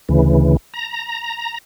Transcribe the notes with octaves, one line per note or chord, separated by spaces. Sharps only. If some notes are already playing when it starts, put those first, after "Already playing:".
D2 C#3 E3
A#5